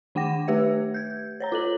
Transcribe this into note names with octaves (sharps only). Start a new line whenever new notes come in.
D#3 D4 F#5 G5 D6 A#6
A3 G4 B4 E5
G6 G#6
C5 C#5 A#5
F4 A4 F#7